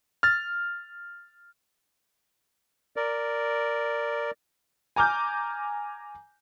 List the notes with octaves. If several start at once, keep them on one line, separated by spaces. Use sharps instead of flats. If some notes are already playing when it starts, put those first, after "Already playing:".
F6 A6
A#4 D5
G#5 A#5 D6 F6 G6